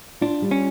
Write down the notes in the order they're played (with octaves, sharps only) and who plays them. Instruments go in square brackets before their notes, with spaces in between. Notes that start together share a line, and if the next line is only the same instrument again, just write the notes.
[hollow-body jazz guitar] D4 [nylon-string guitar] F4
[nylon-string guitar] G3
[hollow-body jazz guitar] C#4